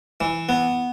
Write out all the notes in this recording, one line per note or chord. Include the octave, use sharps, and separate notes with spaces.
E3
B3